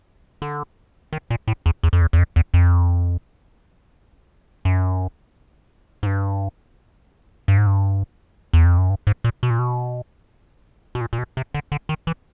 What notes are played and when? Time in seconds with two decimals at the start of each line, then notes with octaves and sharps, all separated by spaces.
0.42 D3
1.13 D#3
1.31 A#2
1.48 A2
1.66 E2
1.83 E2
1.93 F2
2.01 E2
2.13 E2
2.18 F2
2.36 E2
2.54 F2
4.65 F#2
6.03 G#2
6.06 G2
7.48 G2
7.58 G#2
7.67 G2
8.53 E2
8.65 F2
8.78 F#2
8.90 G2
9.07 G#2
9.24 A#2
9.43 B2
9.50 A#2
9.59 B2
10.95 B2
11.01 A#2
11.13 A#2
11.18 B2
11.37 C3
11.54 D3
11.72 D3
11.89 D#3
12.07 E3